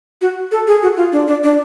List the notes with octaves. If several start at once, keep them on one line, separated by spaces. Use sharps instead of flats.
F#4
A4
G#4
F#4
F4
D4
D4
D4